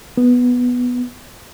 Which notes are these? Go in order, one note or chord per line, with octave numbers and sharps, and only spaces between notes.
B3